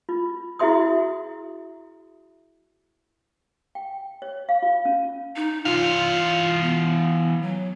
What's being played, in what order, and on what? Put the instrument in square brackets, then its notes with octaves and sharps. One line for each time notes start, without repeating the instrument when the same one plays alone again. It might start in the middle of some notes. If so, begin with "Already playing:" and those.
[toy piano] F4
E4 F#4 G#4 E5 C6 D#6
G5
C#5
F5
F4
C#4
[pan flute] D#4
[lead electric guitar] E3 F5 [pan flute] F4
[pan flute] B3
F#3